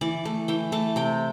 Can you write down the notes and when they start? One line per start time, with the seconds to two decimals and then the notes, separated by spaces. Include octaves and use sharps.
0.01 E3 D5
0.25 A3
0.48 E3 G5
0.72 A3 A5
0.96 C3 G5